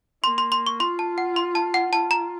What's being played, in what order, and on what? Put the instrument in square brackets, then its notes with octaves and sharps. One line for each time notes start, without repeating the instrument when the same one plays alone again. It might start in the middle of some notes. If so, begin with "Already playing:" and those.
[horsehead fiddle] A#3 [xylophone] C6
[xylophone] C6
C6
C#6
[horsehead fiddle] F4 [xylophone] C6
[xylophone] A5
F#5
C6
A5
F#5
[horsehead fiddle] F4 [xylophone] A5
[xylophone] A#5